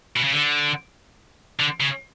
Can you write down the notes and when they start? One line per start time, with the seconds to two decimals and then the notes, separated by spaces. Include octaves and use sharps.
0.16 B2
0.24 C#3
0.33 D3
1.59 D3
1.80 C#3